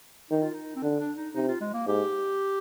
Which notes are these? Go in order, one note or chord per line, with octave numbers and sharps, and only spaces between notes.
D#3 D#4
F4
D#4
C4
D3 D4
D4
D#4
C3 D#4
F4
G#3
A#3
G#2 G4